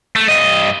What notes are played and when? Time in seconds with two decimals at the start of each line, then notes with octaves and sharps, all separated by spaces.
0.16 A3
0.29 G2 D#5